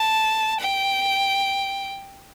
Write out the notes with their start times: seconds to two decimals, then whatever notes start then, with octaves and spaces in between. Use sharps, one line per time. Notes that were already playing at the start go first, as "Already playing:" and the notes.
Already playing: A5
0.60 G5